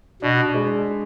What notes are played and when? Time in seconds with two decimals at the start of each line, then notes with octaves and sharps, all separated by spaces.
0.22 B2 D4
0.54 G#3